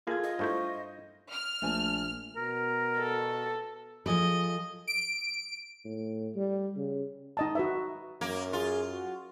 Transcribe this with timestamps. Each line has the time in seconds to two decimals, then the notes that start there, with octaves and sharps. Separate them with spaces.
0.07 A#3 F4 G#4 A4 G#6
0.23 D#5
0.39 G2 A3 E4 C5 C#6 G6
1.31 F6
1.62 A#1 A3 G#5 A5
2.36 B2 A#4
2.98 A4
4.06 F3 G#4 A4 D#5
4.87 D7
5.85 A2
6.36 G3
6.76 C#3
7.37 D#4 D#5 A5
7.55 F#4 B4 E5
8.21 F#2 A#3
8.53 F4 G#4
8.92 F#4